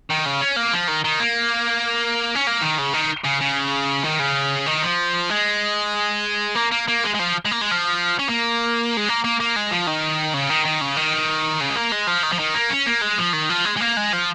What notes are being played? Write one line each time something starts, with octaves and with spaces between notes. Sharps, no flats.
D#3
C#3
C#4
A#3
F3
D#3
D#3
A#3
C#4
A#3
D#3
C#3
D#3
C#3
C#3
D#3
C#3
D#3
F3
G#3
A#3
A#3
A#3
G#3
G#3
F3
G#3
A#3
G#3
F3
C#4
A#3
G#3
A#3
A#3
A#3
G#3
F3
D#3
C#3
D#3
D#3
C#3
D#3
C#3
G#3
A#3
G#3
F3
D#3
F3
D#3
A#3
C#4
A#3
G#3
F3
D#3
F3
G#3
G#3
A#3
G#3
F3